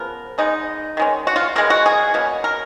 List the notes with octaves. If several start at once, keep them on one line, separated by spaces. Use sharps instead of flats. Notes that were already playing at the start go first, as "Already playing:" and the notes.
Already playing: C#3 F3 B3 A#4
C#3 G#3 B3 D#4
D#3 G#3 C#4
F#4
F4
C#3 G#3 B3 A#4
F#4
G#4
B2 A#3 C#4
A#4